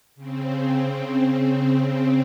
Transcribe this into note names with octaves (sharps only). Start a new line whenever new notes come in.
C#3 C4